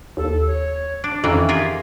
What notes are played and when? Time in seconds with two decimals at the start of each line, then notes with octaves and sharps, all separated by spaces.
0.17 D#2 A4
0.47 C#5
1.04 D4
1.24 F2 D#3 E3 A#3 C#4
1.49 F4 G4 G#4 A#4